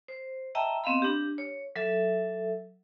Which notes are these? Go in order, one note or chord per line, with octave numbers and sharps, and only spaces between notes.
C5
D#5 E5 G5 A5 A#5 E6
B3 C4 D#5 F5 B5
D4 G4
C#5
F#3 A4 E5